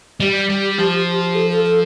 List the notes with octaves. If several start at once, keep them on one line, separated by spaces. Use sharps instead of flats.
G3 G4
G3
F3
A4
A4
A4